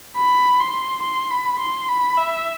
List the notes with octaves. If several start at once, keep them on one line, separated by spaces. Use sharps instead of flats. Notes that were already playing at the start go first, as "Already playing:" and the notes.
B5
C6
C6
B5
C6
B5
E5